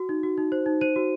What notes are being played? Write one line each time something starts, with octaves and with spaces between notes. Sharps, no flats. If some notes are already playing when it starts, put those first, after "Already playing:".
Already playing: F#4
D#4
F#4
D#4
C5
D#4
C5 D#7
F#4